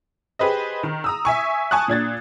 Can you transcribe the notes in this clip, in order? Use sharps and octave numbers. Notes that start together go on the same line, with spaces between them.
G4 G#4 B4 C5 D#5
D#3
A#5 D#6 E6
E5 G#5 C#6
G#5 A5 C#6 D#6 F#6
A#2 D4 G#6 A6